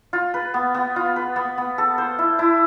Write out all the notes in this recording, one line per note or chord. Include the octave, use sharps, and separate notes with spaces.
F4
B4
B3
B3
F4
B4
B3
B3
A4
C5
E4
E4